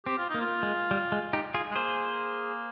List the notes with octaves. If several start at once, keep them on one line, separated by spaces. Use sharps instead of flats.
C4 G4
F4
A#3 D#4
F4
G#3
G3
G#3
D#4 G4
F4 G#4
G#3
A#3 G#4 C5